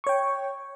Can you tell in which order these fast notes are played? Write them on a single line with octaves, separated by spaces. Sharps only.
C#6 C#5 G5